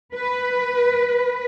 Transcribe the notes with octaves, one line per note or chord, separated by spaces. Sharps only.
B4